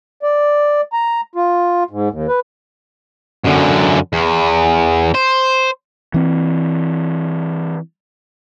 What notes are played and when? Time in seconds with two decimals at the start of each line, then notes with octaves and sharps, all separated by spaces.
0.23 D5
0.93 A#5
1.35 F4
1.90 G#2
2.10 D#2
2.28 B4
3.45 F#2 D3
4.13 E2
5.15 C5
6.14 E3 C4